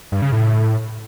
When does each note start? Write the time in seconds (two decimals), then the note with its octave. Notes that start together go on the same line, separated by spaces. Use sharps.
0.12 G2
0.22 C#3
0.32 A2